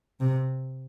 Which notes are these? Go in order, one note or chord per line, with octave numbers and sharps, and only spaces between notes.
C3